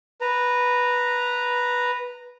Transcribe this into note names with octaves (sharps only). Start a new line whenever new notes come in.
B4 A#5